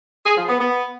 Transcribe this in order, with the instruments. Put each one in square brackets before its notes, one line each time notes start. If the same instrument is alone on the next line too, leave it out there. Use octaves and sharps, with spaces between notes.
[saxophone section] G#4
F3
B3
B3